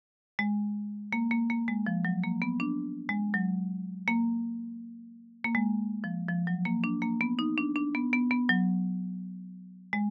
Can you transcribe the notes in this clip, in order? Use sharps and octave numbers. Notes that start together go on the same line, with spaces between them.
G#3
A#3
A#3
A#3
G#3
F3
F#3
A#3
B3
D4
G#3
F#3
A#3
A#3
G#3
F3
F3
F#3
A#3
D4
A#3
B3
D#4
D4
D4
B3
B3
B3
F#3
G#3